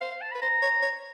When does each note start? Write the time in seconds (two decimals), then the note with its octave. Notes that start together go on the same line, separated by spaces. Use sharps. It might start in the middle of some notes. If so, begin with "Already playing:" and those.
0.01 C5 F5
0.11 F5
0.22 A5
0.32 B5
0.35 B4
0.42 C5 A#5
0.62 C#5
0.82 C#5